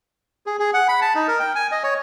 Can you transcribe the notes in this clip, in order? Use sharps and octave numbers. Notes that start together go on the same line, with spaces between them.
G#4
G#4
F#5
B5
A5
D#4
A#4
G5
G#5
D#5
C#5